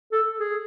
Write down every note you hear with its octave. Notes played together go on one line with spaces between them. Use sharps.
A4
G#4